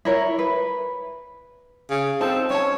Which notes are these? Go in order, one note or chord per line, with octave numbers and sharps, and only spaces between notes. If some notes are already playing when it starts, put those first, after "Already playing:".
E4 A#4 C#5
B4
C#3
C4 D#4 A4 A5
C#4 C#5 A5